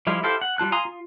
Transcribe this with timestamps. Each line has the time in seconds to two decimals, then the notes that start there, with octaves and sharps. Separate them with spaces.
0.07 F3 G3 G#3 E4 F4
0.23 E4 G4 A4 C5 F5
0.41 F#5
0.58 G3 F4 A5 F#6
0.72 F5 G#5 A#5 C6 D#6
0.85 F4